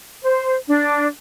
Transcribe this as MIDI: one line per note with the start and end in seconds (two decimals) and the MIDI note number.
0.22 0.55 72
0.68 1.06 62